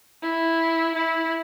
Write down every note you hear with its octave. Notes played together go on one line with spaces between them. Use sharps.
E4
E4